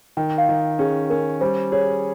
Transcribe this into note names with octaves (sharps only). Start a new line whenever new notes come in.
D#3 G5
F5
D#3
C#4 G#4
C#4 A#4
G3 C5
G#4 C#5